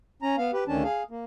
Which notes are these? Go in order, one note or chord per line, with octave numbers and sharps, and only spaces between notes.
C#4 A#5
B3 F5
G4 B4
D2 D#3 C#4 D4 A5
G#4 F5
A#3